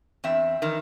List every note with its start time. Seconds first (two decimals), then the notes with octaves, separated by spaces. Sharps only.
0.24 E2 C4 E5
0.62 D#3 E3